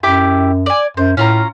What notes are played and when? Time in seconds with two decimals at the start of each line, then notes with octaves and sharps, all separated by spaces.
0.03 F#2 E4 G4 D6
0.66 D5 G#5
0.97 F#2 C5
1.17 A2 C#4 F4 A#5